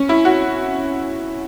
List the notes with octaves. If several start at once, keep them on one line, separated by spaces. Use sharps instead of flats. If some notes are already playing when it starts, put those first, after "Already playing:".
Already playing: C#4
E4
F#4